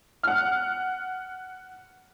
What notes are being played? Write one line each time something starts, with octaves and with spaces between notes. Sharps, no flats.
F#5 F6